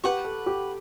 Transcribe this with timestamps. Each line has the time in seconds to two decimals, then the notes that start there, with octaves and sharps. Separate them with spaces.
0.04 G4 B4 F#5 C#6
0.24 A4
0.46 G4